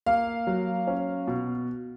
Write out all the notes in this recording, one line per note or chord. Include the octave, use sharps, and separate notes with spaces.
A#3 F5
F#3
C#4
B2